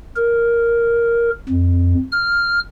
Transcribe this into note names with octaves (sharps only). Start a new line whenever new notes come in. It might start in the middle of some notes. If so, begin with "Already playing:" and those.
A#4
F2
F6